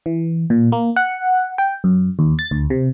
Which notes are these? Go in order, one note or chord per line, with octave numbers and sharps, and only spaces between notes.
E3
A#2
A#3
F#5
G5
F#2
D#2
A6
D2
C3